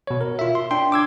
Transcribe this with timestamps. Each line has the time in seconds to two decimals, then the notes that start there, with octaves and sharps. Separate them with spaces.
0.07 B2 C#5
0.21 A#4
0.39 F4 E5
0.55 C6
0.71 D4 G5 C6
0.92 D6 E6 G#6